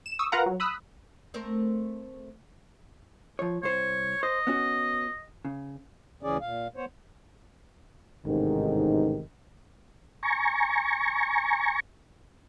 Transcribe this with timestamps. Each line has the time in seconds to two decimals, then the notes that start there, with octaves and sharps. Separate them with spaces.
0.06 E7
0.19 C#6 D#6 E6
0.32 F4 A#4 B4 F5 F#5 A#5
0.46 F#3
0.60 B5 D#6 E6 F#6
1.34 A3 C4 A#4
3.39 F3 C#5
3.63 C2 C5 C#5
4.23 C5 D#5
4.47 B3 C#4 F#4
5.45 C#3
6.23 D2 C#3 E3 C#4 G#4 D5
6.41 A#2 F5
6.76 B3 C5 C#5
8.26 A1 G#2 C3 D#3
10.23 G#5 A#5 C#6